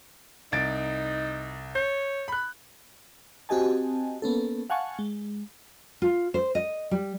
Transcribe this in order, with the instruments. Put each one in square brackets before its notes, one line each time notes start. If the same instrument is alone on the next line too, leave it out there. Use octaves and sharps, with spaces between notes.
[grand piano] C2 A6 D7 [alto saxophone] D#4
[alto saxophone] C#5 [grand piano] G6
[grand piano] B5 F#6
[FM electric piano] C4 F#4 G4 D#5 G#5 A5
A#3 B3 C#4 A4
F5 F#5 G#5 A5 C#6
G#3
[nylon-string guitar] F4
C5
D#5
G3